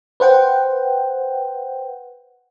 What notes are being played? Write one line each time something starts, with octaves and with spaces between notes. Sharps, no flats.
B4 C5 F#5 G5